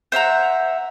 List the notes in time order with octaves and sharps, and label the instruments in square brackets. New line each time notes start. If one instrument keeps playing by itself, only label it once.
[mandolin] C5 E5 F#5 A#5